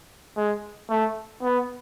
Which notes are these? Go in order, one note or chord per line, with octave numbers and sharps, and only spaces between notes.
G#3
A3
B3